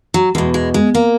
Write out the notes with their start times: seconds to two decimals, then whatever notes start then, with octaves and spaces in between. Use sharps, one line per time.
0.14 F#3
0.35 E2 B2 G#3
0.54 G#3
0.74 G#3
0.95 A#3